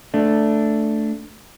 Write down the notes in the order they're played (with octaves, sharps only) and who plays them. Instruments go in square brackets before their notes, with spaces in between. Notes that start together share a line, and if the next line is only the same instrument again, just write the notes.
[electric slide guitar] A3 D4